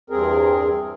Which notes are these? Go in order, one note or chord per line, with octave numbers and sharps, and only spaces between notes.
E2 G2 C4 G#4 A#4